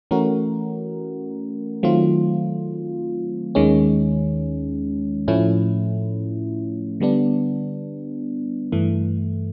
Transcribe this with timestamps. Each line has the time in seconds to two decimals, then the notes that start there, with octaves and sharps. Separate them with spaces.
0.11 E3 A3 C#4 F#4 A#4
1.83 D#3 F#3 A3 C4 F4
3.55 D#2 D#3 G#3 C#4
5.28 A2 F3 A3 C#4 E4
7.00 D3 G3 B3 D4
8.72 G2 E3 A3